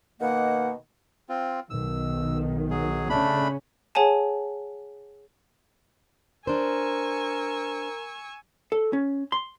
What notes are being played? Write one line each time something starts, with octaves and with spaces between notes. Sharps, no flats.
B2 D#3 A#3 F#5
C4 F4
B1 D#3 E6
F#3 G#4
C#3 A3 C#4 D4 B5
G#4 C#5 F#5 G#5 A5
D4 A#4 C5 G#5 C#6 E6
A4
C#4
C6